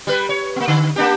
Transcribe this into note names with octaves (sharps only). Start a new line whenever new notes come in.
G3 B4
C#5
A#3 B3
D3
A#3 D4 G4